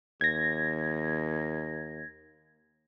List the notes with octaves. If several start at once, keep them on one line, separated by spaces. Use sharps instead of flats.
D#2 G#6 A#6